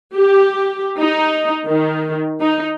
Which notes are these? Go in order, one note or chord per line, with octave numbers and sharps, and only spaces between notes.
G4
D#4
D#3
D#4